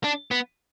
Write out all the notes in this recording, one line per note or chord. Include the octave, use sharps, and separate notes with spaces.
D4
B3